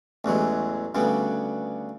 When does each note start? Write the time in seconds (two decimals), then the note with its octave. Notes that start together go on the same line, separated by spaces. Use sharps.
0.24 A1 E2 F#3 G#3
0.95 D2 C#3 G3 B3